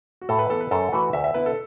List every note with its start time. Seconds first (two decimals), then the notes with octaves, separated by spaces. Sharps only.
0.21 F#4
0.29 A2 A4
0.39 B4
0.50 E3 B3 A4
0.60 B4
0.71 F#2 A4
0.92 E3 A3 F#4 B4
1.13 D2 E5
1.24 E5
1.34 D3 B3 E4 B4
1.46 A4